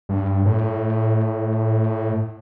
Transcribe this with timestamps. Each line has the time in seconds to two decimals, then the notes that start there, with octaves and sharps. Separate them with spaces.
0.09 G2
0.45 A2